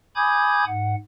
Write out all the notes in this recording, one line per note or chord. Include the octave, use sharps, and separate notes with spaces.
G#5 B5 D6 D#6 G6 G#6
G#2 F#5